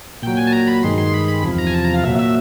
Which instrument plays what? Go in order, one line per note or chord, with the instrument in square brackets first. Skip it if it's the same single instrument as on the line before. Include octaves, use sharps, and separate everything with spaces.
[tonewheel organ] A#2 F#3 G5
G#5
A5
A#5
B5
G2 D#3 G#3 C6
C6
B5
B5
E2 C3 F3
A#5
G#5
A5
A#5
F5
A#2 F#3 E5
E5